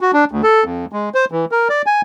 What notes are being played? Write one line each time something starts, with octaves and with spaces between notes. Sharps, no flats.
F#4
D4
D2
A4
F2
G#3
C5
E3
A#4
D5
G#5